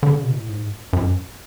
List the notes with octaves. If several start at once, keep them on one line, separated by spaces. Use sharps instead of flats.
D3
C#3
B2
A2
G#2
F#2